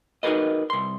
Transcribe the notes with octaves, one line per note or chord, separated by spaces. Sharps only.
D#4 F#4 G#4 A#4 B4 D#5
C2 C6